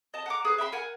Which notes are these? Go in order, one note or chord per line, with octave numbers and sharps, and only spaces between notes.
D#5 A5
F#5 A#5 D6
G#4 B4
E5 G5 B5 C6
A#4 F#5 G#5